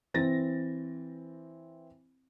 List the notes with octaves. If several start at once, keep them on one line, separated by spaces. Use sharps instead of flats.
E3 C4 A6 A#6